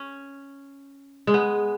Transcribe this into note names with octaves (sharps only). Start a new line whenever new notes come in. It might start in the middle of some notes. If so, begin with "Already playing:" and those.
Already playing: C#4
G#3
B3